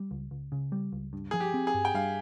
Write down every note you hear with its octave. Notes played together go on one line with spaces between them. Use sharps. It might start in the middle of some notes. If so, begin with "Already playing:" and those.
Already playing: G3
C#2
C#2
C#3
G3
C#2
G2
F3 G#4
G4
C4
G#4
G2
G5
G2 F5